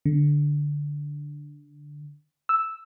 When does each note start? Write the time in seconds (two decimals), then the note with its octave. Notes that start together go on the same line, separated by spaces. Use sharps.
0.05 D3
2.49 E6